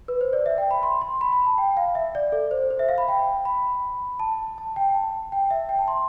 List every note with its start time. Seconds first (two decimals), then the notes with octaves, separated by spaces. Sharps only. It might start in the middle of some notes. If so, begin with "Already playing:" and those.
0.08 B4
0.21 C5
0.33 D5
0.46 E5
0.58 G5
0.71 B5
0.83 C6
1.01 C6
1.21 B5
1.33 B5
1.46 A5
1.58 G5
1.77 F5
1.95 E5
2.15 D5
2.32 A4
2.51 C5
2.70 C5
2.79 E5
2.89 F5
2.98 B5
3.08 G5
3.45 B5
4.20 A5
4.58 A5
4.76 G5
4.94 A5
5.32 G5
5.51 E5
5.69 G5
5.79 A5
5.88 C6